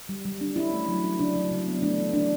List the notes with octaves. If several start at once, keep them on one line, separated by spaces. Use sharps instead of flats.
G3
G3
D4
C#4 E4
A3
F#3
C#4
C#3 D4
F#3
C#3
B3
A3 D4
E3
C#4 D4